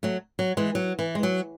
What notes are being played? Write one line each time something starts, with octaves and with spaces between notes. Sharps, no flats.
F#3 A3
F#3
E3 G#3
F#3
E3
G#3
F#3